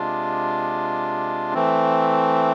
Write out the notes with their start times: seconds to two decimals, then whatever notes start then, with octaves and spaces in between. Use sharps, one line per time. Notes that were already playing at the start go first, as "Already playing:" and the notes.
Already playing: C3 G#3 D4 F4
1.54 E3 A3 C4